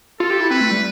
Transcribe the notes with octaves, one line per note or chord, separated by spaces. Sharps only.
F4 A4
G4
E4
C4 B4
A3
G3